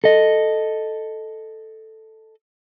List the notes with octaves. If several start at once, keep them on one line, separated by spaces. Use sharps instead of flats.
A4 D#5